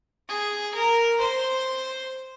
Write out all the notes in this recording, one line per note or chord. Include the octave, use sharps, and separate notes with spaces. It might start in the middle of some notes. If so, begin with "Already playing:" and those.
G#4
A#4
C5